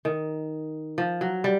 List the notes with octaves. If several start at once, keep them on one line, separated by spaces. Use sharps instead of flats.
D#3
F3
F#3
G3